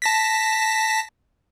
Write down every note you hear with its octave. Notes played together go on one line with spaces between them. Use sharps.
A5 A#6 B6